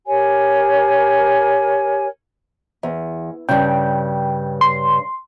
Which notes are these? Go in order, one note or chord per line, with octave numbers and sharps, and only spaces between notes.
G4 A#4 C#5 G#5
E2
G2 C#3 G5
C6